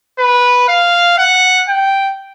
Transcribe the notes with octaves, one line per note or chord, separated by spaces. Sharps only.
B4
F5
F#5
G5